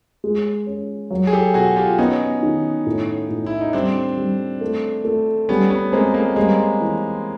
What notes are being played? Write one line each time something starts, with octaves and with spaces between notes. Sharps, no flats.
G#3
C#4
F#3
G#4
G4 A4
B2 F#4 G#4
F4 G4
B3 C#4 D#4
D#3
A2
A2
E4
D#4
G3 C4 D4
G3
A3
A3
G3 B3 C#4
B3 C#4
G#3 A#3 C4
G#3 A#3
G3 G#3 A#3
E3